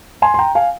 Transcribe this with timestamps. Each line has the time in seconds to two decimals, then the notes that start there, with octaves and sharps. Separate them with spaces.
0.22 G#5 C6
0.34 C6
0.39 G5 A#5
0.55 F5 G#5